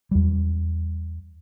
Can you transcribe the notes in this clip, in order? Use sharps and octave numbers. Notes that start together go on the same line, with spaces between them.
E2 G3